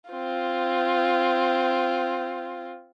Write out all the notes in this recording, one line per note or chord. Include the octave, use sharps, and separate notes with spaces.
C4 F4